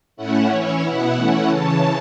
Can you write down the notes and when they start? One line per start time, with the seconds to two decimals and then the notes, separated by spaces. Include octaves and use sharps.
0.16 A2 A3 C#4 E4 F#5
0.49 E3 C#4 E4 C#5
0.81 B2 B3 E4 F#5
1.14 E3 A3 C#4 E4 F#5
1.47 C#3 E3 C#4 A5